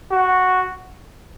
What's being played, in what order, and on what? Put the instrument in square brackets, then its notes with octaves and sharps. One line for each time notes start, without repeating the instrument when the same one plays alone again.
[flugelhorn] F#4